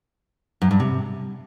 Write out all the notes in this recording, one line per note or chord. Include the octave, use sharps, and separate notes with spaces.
F#2
G2
C3